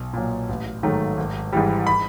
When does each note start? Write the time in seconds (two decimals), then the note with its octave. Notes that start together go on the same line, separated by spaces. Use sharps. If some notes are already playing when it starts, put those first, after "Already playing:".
Already playing: B1
0.13 A#2 F#3
0.49 A1
0.83 G#2 D#3 F#3 A3
1.17 G#1
1.53 G#2 E3 G3
1.87 B5